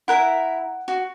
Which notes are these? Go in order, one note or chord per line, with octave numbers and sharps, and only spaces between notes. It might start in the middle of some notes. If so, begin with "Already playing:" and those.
E4 A#4 E5 F#5 F#6
F#4